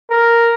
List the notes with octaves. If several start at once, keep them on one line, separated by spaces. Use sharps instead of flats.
A#4